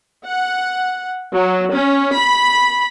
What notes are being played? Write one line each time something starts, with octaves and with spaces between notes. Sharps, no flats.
F#5
F#3
C#4
B5